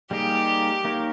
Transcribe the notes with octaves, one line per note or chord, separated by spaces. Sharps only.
G3 A#3 D#4 G4 G#4
A#3 D#4 A#4 C#5